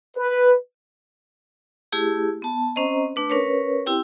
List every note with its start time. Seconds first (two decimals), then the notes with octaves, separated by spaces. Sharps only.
0.17 B4
1.92 A3 E4 G4 G#4
2.42 B3 A5
2.75 C4 C#4 C5 D#5 A#5
3.16 A3 D4 B4
3.30 C#4 A#4 B4 C#5
3.86 C4 E4 G4 G5